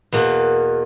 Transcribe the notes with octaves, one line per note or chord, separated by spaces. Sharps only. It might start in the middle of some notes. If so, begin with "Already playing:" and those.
E2 B2 A#3